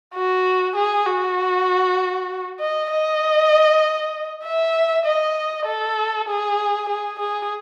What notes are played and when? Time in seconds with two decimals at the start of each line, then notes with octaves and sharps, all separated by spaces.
0.15 F#4
0.76 G#4
1.06 F#4
2.60 D#5
2.90 D#5
4.44 E5
5.05 D#5
5.66 A4
6.28 G#4
6.89 G#4
7.19 G#4